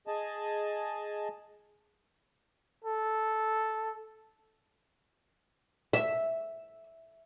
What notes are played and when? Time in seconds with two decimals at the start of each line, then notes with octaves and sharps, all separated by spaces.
0.07 G#4 D#5 G#5 A5
2.84 A4
5.93 E5